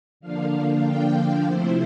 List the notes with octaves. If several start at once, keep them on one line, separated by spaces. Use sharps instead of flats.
D3 F3 A#3 D4 F5
G5
C3 F3 A3 E4 C5